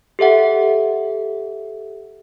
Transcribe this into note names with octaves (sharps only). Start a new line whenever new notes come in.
G4 A4 E5 F#5